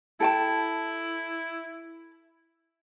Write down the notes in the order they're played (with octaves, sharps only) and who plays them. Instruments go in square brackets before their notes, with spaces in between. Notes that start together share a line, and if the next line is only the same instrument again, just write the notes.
[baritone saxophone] E4 [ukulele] A4 G5 A5